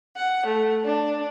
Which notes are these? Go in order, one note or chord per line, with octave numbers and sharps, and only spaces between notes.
F#5
A3
D4